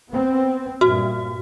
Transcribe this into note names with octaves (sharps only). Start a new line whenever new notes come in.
B3 C4
G2 A#2 F#4